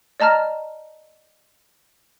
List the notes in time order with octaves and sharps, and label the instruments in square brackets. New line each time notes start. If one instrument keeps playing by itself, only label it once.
[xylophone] D5 D#5 A5 A#5 F6